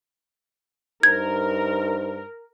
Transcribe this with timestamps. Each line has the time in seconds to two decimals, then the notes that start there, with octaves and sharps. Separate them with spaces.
1.03 G2 D#4 A#4 C5 G#6